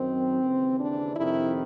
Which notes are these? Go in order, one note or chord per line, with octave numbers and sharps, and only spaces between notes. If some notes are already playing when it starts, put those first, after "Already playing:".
Already playing: F#2 D#3 C4
D#2 C#3 E3
D4
F2 C3 D#3 E4